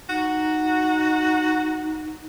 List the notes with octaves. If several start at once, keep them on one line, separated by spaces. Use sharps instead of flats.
D#4 F#4